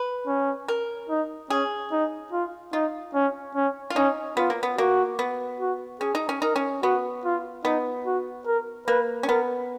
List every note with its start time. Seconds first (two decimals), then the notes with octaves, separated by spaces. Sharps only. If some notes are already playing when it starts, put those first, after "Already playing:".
Already playing: B4
0.27 C#4
0.68 A#4
1.10 D#4
1.50 C#4 G#4
1.92 D#4
2.32 F4
2.73 D#4 F4
3.14 C#4
3.55 C#4
3.90 F4
3.96 C#4 D#4
4.37 B3 F4
4.50 A#3
4.63 B3
4.78 A#3 F#4
5.19 B3
5.60 F#4
6.01 C#4 G#4
6.15 D#4
6.29 C#4
6.42 D#4 A#4
6.56 C#4
6.83 B3 F#4
7.24 F4
7.65 B3 D#4
8.06 F#4
8.47 A#4
8.87 A#3 B4
9.23 C#4
9.28 B3 A#4